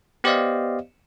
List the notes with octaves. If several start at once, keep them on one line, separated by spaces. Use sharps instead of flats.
B3 G4 C5 D5 D#5 F5